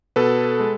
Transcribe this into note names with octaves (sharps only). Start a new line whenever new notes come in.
B2 A4 B4
G#3